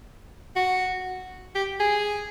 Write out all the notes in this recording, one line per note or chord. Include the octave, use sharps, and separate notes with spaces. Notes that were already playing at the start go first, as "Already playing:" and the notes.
F#4
G4
G#4